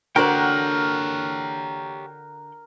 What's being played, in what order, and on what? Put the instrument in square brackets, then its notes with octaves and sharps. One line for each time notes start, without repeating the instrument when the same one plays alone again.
[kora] D3 F#4 C5 [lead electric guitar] G4 C#5 [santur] A#4 [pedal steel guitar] F#5 G5